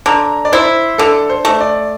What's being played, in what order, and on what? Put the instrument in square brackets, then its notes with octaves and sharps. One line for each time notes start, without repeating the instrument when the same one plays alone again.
[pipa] D3 [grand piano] A#5
[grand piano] D5
[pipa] E4 [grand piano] C5
[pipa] D3 [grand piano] A4
[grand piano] C5
[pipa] A3
[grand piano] D5